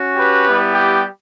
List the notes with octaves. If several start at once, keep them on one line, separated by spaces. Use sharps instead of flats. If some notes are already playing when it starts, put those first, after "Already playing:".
Already playing: C#4 F#4
G4 B4
G3 B3 E4
G4